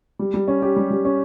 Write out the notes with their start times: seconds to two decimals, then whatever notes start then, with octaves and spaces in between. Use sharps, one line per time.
0.19 G3
0.34 G3
0.48 C#4
0.62 G4
0.77 G3
0.91 G3
1.05 C#4